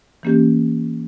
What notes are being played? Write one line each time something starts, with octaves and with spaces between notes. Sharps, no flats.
E3 A#3 C#4 G4